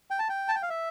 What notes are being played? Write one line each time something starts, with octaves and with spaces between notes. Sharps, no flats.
G5
A5
G5
A5
G5
F5
E5